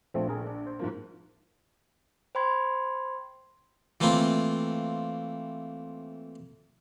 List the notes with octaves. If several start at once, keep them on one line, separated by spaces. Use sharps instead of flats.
A#1 F3 A3 C4
G#4 A#4
D4
C5
G#2 F3 A#3
C5 G5 B5 C6 G#6
E3 A3 A#3 C4 F4